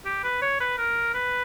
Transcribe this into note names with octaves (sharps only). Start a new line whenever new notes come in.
G4
B4
C#5
B4
A#4
B4